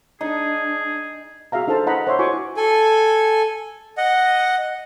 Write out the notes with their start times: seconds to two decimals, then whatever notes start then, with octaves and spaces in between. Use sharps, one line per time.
0.21 D4 D#4 G#4
1.52 F#4 G#4 E5 F5 A#5
1.68 D4 D#4 A4 C5 A5
1.86 E4 B4 D#5 F#5 A#5 B5
2.07 C5 C#5 D#5 E5 C6
2.19 E4 F#4 G#5 C#6 D6
2.57 A4 G#5
3.97 D#5 F#5